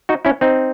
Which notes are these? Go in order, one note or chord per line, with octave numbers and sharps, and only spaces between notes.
D#4 F#4
C#4 E4
C4 D#4